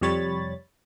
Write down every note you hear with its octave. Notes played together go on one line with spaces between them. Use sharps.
F2 C3 G3 C#5 B5 A6